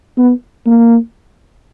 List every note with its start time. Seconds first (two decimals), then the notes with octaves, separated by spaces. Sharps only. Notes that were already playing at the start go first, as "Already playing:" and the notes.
0.18 B3
0.66 A#3